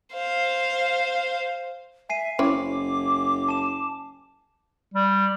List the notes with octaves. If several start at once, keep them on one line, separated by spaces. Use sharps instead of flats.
C5 F5
E5 G#5 C7 D#7
F#1 C4 C#4 E4 D6
A5 E7
G3